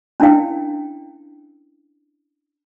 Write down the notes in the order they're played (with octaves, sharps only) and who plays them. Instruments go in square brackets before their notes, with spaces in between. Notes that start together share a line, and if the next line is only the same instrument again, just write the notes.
[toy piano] C#4 D4 E4 A#4 F5 G5